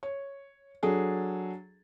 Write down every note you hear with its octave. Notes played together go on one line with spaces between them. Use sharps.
C#5
F#3 D4 G#4 A4